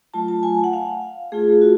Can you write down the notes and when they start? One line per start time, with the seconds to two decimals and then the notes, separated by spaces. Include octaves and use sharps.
0.14 F#3 A3 F4 A5
0.28 A5
0.43 G#5
0.64 F#5
0.73 F5
1.32 A3 F4 G#4
1.62 F#4